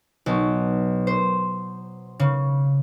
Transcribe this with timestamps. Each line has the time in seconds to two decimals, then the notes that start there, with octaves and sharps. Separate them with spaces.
0.26 B1
1.07 C5
2.20 C#3